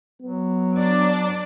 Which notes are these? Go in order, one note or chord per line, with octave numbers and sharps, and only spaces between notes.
F#3 B3
D4 D5